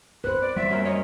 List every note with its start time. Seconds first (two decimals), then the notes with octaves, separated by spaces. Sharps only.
0.24 B4 C5 F#6
0.41 D5
0.57 G3 E5
0.70 F#2 A#3
0.85 C#5 D#5